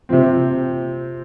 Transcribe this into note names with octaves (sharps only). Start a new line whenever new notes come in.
C3 F3 C4